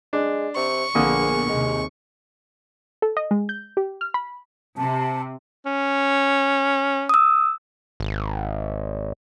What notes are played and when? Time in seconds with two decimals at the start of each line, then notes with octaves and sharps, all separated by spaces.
0.13 G#3 D4
0.56 C3 C#6
0.95 A#1 D3 A#3 B3 G#4 D#6
1.49 D#2 C3 G#3
3.02 A4
3.17 D#5
3.31 G#3
3.49 G6
3.77 G4
4.01 F6
4.14 B5
4.77 C3 A5
5.66 C#4
7.09 D#6 E6
8.00 G#1